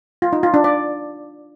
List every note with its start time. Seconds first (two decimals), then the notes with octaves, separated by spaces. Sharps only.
0.22 F4
0.33 D#4
0.43 F4
0.54 D4
0.64 D5